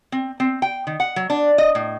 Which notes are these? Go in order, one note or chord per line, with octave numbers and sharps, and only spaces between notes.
C4
C4
G5
D#3
F#5
F#3
D4
D#5
A2